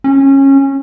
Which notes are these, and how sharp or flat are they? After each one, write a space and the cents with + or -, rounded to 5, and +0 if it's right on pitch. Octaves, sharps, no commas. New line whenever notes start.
C#4 -20